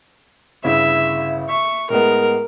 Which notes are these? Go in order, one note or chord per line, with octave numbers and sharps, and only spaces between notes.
G1 C#3 E4 E5
E5 C#6
A2 G#3 B3 A#4